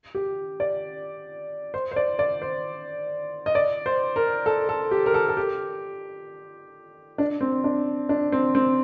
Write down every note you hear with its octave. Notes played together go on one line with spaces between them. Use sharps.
G4
D5
C5
C5
D5
D5
C5
D#5
D5
C5
A#4
A4
A4
G4
A#4
A4
A4
G4
D4
C4
D4
D4
C4
C4